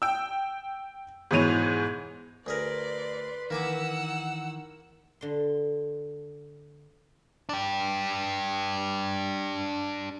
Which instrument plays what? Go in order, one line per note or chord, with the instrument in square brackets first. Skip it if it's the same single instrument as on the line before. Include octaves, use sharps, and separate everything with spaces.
[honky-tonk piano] G5 E6
G#2 B2 E3 C#5 D#7 F7
[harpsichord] D2 G#4 A#4 [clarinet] B4 [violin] D5 C6
[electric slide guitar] D#3 E3 [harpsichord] A#3 G#5 D6 [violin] F#5 E6
[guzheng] D3 C6
[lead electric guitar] D4 G4